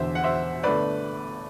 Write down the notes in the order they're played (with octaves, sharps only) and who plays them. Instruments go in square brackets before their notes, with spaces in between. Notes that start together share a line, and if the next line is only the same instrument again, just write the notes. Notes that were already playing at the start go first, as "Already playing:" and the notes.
Already playing: [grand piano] E1 E2 D3 C5 E5
F#5
C5 E5
G1 D3 A3 B4 D5